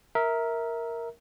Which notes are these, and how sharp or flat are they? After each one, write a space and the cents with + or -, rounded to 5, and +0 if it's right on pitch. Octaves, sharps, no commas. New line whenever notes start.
A#4 +0 E5 -20